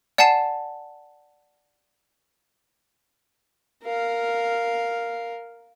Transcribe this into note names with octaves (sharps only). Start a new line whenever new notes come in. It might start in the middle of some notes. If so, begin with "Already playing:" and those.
D5 F#5 G#5 A5 C7 E7
A#4 F5